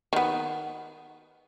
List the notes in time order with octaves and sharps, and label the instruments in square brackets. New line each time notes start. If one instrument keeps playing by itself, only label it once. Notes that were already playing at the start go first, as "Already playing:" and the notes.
[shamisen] D#3 B3